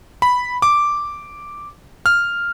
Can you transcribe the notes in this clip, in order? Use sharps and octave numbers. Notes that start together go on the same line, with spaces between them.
B5
D6
F6